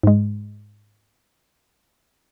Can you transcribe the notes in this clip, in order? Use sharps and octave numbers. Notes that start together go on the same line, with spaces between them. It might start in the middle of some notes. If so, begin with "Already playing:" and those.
G#2 G#3